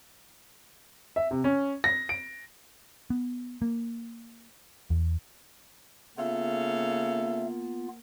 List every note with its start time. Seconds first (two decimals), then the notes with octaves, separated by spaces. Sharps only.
1.16 E5
1.31 C3
1.44 C#4
1.84 A#6
2.09 D7
3.10 B3
3.62 A#3
4.90 E2
6.18 C#3 A#3 B3 F4 A4 E5 F5